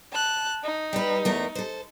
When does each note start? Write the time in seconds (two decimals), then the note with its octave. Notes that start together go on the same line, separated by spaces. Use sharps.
0.12 A5 F#6
0.63 D#4
0.93 G3 B4
1.25 E2 A3 A#4
1.55 A4 C5